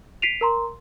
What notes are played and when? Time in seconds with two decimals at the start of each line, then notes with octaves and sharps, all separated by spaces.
0.22 B6 C7 D7 D#7 F7
0.41 A#4 A#5 C6